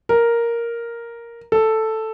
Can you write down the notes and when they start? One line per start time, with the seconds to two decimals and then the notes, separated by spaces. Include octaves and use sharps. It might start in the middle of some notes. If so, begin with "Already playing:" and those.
0.09 A#4
1.52 A4